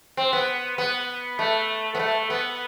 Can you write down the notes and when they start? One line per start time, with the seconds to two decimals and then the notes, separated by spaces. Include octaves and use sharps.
0.17 C4
0.33 B3
0.78 B3
1.39 A3
1.95 B3
1.99 A3
2.30 B3